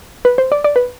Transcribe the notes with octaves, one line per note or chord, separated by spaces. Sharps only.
B4
C5
D5
D5
B4